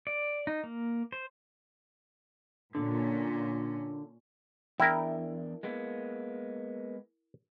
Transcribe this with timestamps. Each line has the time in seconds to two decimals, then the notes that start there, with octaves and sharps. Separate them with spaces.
0.07 D5
0.47 D#4
0.64 A#3
1.12 C5
2.75 A#2 D3 C#4
4.80 E2 D4 E4 A#4 G5
5.63 G#3 A#3 B3